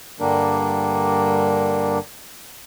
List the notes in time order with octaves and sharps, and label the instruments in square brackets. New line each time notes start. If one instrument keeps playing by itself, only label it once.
[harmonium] G2 D3 G3 A#3 D4 A#4